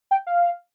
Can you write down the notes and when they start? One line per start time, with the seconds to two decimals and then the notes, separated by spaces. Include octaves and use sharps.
0.11 G5
0.27 F5